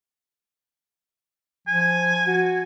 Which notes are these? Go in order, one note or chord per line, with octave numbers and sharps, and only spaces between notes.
F3 G#5
F#4